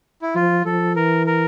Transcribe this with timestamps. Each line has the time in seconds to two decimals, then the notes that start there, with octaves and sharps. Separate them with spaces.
0.22 E4
0.35 F3 F4
0.65 F3 A4
0.96 E3 A#4
1.26 A#4